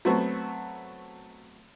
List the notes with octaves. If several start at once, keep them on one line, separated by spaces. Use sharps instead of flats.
F#3 A3 B3 C4 F#4